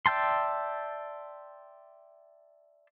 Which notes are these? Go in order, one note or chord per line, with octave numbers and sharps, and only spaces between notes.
D5 E5 G5 A5 C6